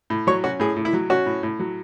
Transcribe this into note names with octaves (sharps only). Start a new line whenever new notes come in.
A2
F#3 C#5
C#4 F#4
A2 G#4
A2
E4
F#3
C#4 F#4
A2
A2
F#3